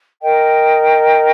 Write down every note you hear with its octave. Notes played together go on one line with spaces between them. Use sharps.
A#4 D#5 G5